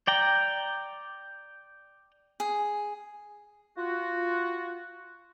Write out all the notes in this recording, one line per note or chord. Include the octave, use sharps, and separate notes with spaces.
D5 G5 A#5
G#4
F4 F#4